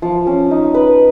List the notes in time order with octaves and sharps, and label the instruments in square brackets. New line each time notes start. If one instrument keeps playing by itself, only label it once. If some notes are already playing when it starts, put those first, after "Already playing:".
[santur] F3
C#4
D#4
B4